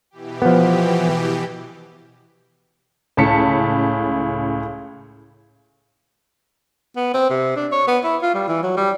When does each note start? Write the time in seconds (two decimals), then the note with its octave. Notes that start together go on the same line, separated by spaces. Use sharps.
0.11 B2 E3 G4
0.42 F3 B3
3.17 C#2 A2 A5 B6 C#7
6.96 B3
7.14 C4
7.30 C3
7.56 D4
7.72 C#5
7.88 B3
8.04 E4
8.22 F4
8.34 G3
8.48 E3
8.63 F#3
8.77 G3